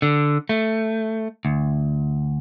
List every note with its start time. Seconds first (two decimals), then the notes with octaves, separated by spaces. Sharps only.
0.02 D3
0.49 A3
1.45 D2